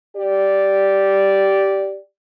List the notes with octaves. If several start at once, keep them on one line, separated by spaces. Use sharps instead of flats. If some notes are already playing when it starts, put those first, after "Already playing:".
G4 D5